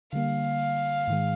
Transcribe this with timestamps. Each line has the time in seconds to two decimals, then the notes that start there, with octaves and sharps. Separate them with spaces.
0.13 D3 G3 A#3 F5
1.08 G#2 D#3 G#3